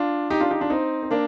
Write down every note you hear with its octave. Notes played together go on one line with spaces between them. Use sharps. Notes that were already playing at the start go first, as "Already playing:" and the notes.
Already playing: D4 F4
D#4 G4
D4 F4
D#4 G4
D4 F4
C4 D#4
C4
A#3 D4